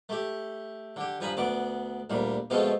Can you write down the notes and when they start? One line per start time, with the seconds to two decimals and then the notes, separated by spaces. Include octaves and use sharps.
0.09 A3 G4
0.96 D3 G4
1.21 G2 F3 G#5 A#5 B5 D#6
1.37 D2 B3 D5 D6
2.10 D2 A#2 G3
2.50 B2 F3 G#3 A3 C4 F4